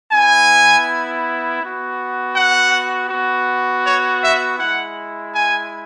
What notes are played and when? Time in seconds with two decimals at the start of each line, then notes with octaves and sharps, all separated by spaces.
0.12 B3 E4 G#5
1.62 B3 F#4
2.35 F#5
3.10 B3 F#4
3.85 C#5
4.23 E5
4.59 G#3 E4 F#5
5.34 G#5